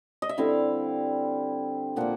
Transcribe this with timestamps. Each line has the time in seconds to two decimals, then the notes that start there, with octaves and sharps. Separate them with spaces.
0.22 D#5
0.29 E5
0.38 D3 G3 C4 E4 F5
1.96 A#2 F3 A#3 F#5